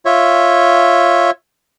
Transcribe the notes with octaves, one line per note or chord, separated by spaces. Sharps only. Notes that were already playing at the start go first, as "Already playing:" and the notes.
F4 C#5 E5